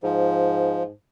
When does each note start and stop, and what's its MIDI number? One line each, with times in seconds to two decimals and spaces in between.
0.03 0.91 44
0.03 0.83 53